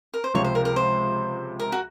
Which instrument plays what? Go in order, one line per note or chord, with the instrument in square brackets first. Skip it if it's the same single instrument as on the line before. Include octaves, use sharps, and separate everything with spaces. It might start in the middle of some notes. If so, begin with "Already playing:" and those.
[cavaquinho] A#4
C5
[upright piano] C#2 C3 F3 C4 F4 [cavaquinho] C#5
[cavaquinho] C5
A#4
A#4
C5
A#4
F#4